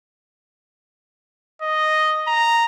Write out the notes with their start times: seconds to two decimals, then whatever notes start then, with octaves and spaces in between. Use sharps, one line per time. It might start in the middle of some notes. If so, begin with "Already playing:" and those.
1.62 D#5
2.28 A#5